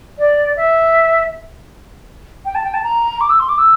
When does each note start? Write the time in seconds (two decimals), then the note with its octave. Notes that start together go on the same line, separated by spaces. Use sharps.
0.19 D5
0.57 E5
2.45 G5
2.55 A5
2.64 G5
2.74 A5
2.83 A#5
3.21 D6
3.30 E6
3.40 C6
3.49 D6
3.58 E6